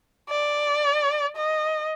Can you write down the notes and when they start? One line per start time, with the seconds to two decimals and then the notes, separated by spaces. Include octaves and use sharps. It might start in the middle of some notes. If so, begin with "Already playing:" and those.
0.30 D5
1.37 D#5